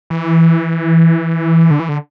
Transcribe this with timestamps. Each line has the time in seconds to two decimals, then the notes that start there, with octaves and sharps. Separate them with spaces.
0.10 E3
1.71 D3
1.80 E3
1.89 D3